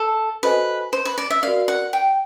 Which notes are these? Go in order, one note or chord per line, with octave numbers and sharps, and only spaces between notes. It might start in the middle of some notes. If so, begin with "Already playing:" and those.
Already playing: A4
F#4 A4 B4 C5 D#5 G#5
C5
B4
D5
E5
F#4 A#4 D5 F5
F#5
G5